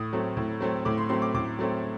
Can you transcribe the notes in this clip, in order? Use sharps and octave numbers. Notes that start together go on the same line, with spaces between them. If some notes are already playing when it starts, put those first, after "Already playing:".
Already playing: A2 D#6
F#3 A3 C4
A2
F#3 A3 C4
A2 D6
C6
F#3 A3 C4 C6
D6
A2 D6
F#3 A3 C4